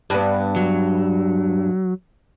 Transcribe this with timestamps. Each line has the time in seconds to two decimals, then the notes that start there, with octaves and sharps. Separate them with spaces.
0.10 G2 B3
0.56 F#3